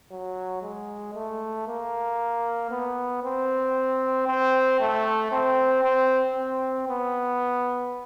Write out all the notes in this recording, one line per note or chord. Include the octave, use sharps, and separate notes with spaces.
F#3
G#3
A3
A#3
B3
C4
C4
A3
C4
C4
C4
B3